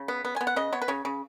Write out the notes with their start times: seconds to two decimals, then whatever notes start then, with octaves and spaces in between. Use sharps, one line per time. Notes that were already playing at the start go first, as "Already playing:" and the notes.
Already playing: C#3
0.08 B3
0.25 B3
0.36 B3 G#5
0.47 F#5
0.56 C#3 D#5
0.73 B3 C#5
0.82 B4
0.88 C#3 C#5
1.05 C#3